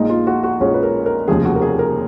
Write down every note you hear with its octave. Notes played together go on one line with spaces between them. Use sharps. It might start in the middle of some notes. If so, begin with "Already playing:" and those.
Already playing: A#1 A#2 G#3 D#4
F4
F#4
F#4
A#1 A#2 G#3 C#4
B4
A#4
A#4
F1 D#2 C#3 F3 G#4
F#4
A#4
G#4
A#4